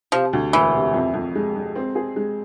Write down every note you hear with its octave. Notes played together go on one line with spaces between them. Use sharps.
C3 F3
D2
E1 E3
C3
F2
F2
G#3
G#3
C4
G#4
G#3